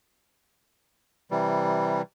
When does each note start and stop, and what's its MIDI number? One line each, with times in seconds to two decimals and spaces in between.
1.31 2.02 48
1.31 2.02 52
1.31 2.02 55